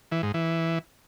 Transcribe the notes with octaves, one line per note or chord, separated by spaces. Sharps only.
E3
G#2
E3